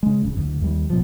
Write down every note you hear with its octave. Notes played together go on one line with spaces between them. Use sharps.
C#3 G#3
D1 G1 C#3
F#1 D2
D#2 G3
A1 B2 F3